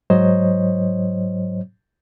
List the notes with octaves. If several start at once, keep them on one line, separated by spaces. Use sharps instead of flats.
G#2 F#3 C5 C#5 D#5